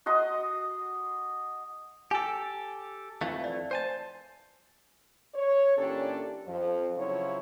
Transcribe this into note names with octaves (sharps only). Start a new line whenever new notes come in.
F#4 D#5 C6 D#6
G4 A4 G#5
F2 E3 A3 F5
D5
C5 G#5 A5
C#5
A#2 E3 C#4 D4 G4 A4
F2 F3
C#3 F3 F#3 E4 C#5